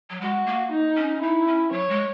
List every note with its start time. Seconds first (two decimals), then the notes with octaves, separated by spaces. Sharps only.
0.10 F#3
0.21 G#3 F#4
0.46 A#3
0.72 D#4
0.97 C#4
1.22 D#4 E4
1.47 C#4
1.72 F#3 C#5
1.90 G#3